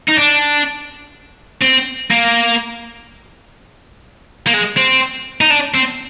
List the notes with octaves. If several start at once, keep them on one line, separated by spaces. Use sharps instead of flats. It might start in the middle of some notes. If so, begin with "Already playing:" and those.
D#4
D4
C4
A#3
A#3
G#3
C4
D#4
D4
C4